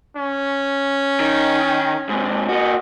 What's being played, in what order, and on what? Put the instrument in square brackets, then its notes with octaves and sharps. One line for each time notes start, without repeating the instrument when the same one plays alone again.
[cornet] C#4
[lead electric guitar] D#3
G#2 C3
[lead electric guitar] A#3 F#4 [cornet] D#5